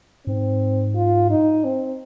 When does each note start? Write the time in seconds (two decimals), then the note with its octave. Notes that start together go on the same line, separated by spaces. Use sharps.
0.26 G#2 C4
0.95 F4
1.30 D#4
1.64 C4